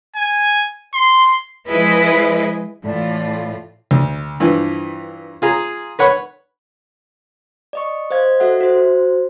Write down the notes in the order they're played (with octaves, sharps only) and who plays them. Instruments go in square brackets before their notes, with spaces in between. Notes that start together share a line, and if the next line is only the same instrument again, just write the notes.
[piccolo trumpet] G#5
C6
[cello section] F3 G#3 E4 G#4 B4 D#5
[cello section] A2 E3 F4 [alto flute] D5
[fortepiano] D2
G2 E3 F3
F4 G#4 A#5
B4 C#5 F#5 B5 C#6
[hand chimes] D5 D#5 C#6
C5 D#5 F5 G#6
F#4 A4 E5 F#5
F#4 C5